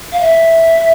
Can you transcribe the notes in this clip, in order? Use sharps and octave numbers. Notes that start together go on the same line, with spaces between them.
F5
E5